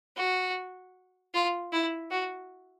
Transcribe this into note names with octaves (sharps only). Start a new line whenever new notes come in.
F#4
F4
E4
F#4